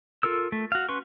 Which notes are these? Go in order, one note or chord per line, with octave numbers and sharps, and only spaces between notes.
F4 A4 A#4 E6
A3
F#4 F5
C#4 B4 C6 C#6